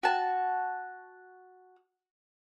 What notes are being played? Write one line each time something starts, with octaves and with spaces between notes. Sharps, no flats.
F#4 A5